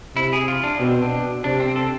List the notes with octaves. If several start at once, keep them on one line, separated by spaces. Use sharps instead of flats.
C3 E4
G#4
F4
D4
B2 C4
D4
C3 D4
C4
A4